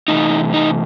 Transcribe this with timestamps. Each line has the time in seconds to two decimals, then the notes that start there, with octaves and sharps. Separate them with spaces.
0.08 C3 E3 A3 D#4
0.54 D#4